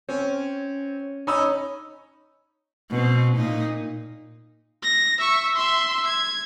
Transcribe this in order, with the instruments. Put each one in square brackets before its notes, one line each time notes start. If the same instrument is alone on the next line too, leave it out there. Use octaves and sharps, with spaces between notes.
[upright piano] C4 [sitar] C#4
[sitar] C#4 [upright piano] D#4 B5 E6
[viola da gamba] B2 C4
A#2 D#4
[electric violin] A#6
E5 C#6
E5 C6
G#6